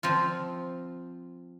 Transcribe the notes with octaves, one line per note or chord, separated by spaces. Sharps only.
F3 C4 F4